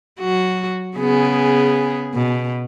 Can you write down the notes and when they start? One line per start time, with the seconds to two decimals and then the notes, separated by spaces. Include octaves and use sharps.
0.20 F#3 F#4
0.97 C#3 B3 G#4
2.14 B2